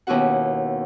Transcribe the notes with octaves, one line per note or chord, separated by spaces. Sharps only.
D#2 B2 C#4 E4 F#4 F#5